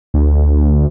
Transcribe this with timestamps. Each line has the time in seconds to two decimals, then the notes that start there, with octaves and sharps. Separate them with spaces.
0.14 D2